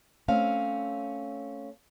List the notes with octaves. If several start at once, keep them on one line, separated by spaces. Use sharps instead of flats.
A3 C4 C#4 F5